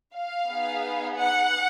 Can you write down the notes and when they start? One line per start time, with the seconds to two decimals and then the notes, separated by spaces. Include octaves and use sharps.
0.15 F5
0.49 B3 D#4 G#4
1.15 F#5